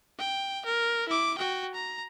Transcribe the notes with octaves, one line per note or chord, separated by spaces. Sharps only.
G5
A#4
E4 D6
F#4 G5
A#5